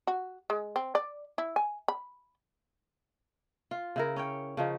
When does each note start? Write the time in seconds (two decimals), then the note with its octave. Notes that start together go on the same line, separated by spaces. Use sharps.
0.07 F#4
0.50 G#3
0.76 C4
0.95 D5
1.38 E4
1.56 G#5
1.88 B5
3.71 F4
3.96 C#3 E4 A#4
4.16 C#4 C#5 G5
4.57 C#3 F3 D#4